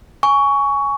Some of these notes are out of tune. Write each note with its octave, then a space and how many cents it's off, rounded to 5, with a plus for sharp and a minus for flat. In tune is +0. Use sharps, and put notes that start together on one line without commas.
G#5 +0 C#6 +15